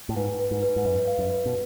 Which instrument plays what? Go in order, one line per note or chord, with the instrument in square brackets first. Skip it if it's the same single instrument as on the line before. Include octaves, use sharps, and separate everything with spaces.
[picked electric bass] A2
[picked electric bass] G#2 [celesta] B4
[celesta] B4
[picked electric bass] G#2
[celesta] B4
[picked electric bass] G#2
[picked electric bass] F#2 [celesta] B4
[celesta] F5
[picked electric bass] F#2
[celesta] B4
[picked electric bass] B2